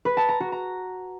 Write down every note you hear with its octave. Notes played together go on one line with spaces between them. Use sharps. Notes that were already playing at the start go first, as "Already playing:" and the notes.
B4
A5
A#5
F#4
A#5